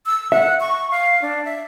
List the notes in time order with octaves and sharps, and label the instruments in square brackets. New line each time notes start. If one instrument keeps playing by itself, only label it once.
[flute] E6
[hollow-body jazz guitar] E5 [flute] F#5
[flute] C#6
F5
D4
E5